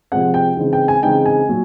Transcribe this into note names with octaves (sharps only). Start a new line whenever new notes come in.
C3 F3 G#3 C4 F#5
G5
C#3 E3 G#3 C4 D#4
G5
G#5
C#3 E3 G#3 C4 D#4 G5
G#5
A#2 F#3